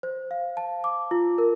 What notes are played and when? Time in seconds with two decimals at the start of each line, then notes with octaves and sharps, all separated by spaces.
0.03 C5
0.31 F5
0.57 A5
0.84 D6
1.11 F4
1.38 A#4